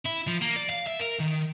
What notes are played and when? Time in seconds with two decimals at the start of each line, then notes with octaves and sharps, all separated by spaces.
0.06 E4
0.28 F3
0.42 A#3
0.56 D5
0.70 F5
0.86 E5
0.99 A#4
1.19 D#3